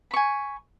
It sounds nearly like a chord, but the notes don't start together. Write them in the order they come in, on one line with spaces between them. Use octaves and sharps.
B5 C#6 G#5